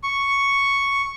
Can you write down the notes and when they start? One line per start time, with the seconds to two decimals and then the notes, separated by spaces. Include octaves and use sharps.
0.03 C#6